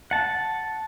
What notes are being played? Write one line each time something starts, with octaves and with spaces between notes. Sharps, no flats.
F#5 A5